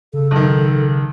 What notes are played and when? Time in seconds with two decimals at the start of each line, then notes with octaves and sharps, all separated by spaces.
0.13 C#3 A4
0.31 B1 D#3